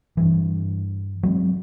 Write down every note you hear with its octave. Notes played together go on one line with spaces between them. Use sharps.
G2 E3
F#3 G#3 B3 C4